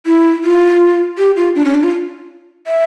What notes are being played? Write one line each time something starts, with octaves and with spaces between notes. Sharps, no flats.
E4
F4
G4
F4
D4
C#4
D4
F4
E5